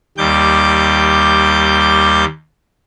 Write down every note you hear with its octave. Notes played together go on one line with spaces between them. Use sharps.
D#2 G3 D6 G6